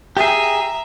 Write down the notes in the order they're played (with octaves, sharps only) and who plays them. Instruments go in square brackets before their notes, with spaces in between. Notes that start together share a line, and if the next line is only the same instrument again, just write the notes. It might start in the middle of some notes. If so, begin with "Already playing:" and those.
[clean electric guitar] G4 G#4 [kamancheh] E5 A#5